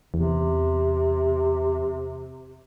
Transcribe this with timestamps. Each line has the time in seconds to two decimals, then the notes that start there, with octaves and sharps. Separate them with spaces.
0.14 E2 C3